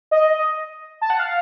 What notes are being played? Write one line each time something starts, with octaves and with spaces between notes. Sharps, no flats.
D#5
A5
F#5
F5